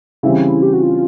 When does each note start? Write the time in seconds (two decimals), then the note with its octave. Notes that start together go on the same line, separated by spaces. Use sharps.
0.23 C#3 E3 G3 C4 E4
0.63 G4
0.73 F#4
0.83 F4